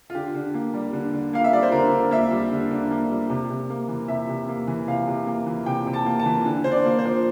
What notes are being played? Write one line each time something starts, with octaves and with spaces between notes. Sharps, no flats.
F4
D3 G4
D3
A#3
G3
D3
D3
A#3 F5
E5
G3 D5
C5
D3 A#4
D3
A#3 E5
G3
D3
D3
A#3
G3
C3
C3
A#3
E3
C3 E5
C3
A#3
E3
C3 F5
C3
A#3
E3
C3 G5
C3
A5
A#3
A5
E3
D3
D3 C5
D5
A#3
C5
F3